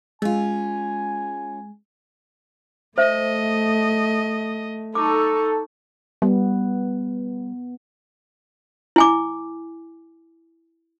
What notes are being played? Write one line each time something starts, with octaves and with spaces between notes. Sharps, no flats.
G#3 C#4 F4 G#5
A3 C5 D#5 E5
D#4 A4 C#6 D6
G3 B3
E4 G#5 D6